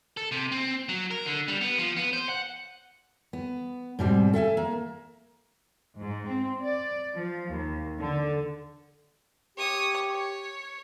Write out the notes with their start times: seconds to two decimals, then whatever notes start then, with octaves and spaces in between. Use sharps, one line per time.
0.17 A4
0.32 C3
0.52 C4
0.89 F#3
1.11 A#4
1.26 D3
1.48 G3
1.61 B3
1.78 F3
1.96 B3
2.13 C5
2.29 F#5
3.33 B3
3.99 G#2 B2 G3 C4
4.33 A4 E5 F#5 G#5
4.57 A#3
5.99 G#2
6.28 C4
6.61 D5
7.14 F3
7.49 D#2
7.99 D3
9.57 G4 C#5 D#6
10.11 C#5